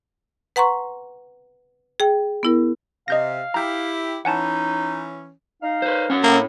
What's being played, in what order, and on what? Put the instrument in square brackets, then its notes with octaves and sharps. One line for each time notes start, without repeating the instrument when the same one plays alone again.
[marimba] B4 F#5 A#5 C6 C#6
G#4 G5
B3 E4 A#4
[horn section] C3 [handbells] D#5 G6 A#6 [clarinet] F5
[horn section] E4 G4 [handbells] A#5 G6
[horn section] E3 C#4 [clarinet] D#4 [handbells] F#5 G#5 A5
[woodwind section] D#4 F5
[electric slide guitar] B4 C5
C#4 F#5
[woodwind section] A2 [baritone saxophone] A#3